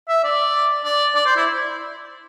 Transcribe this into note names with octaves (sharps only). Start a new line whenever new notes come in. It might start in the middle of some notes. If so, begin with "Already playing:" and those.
E5
D5
D5
D5
C5
E4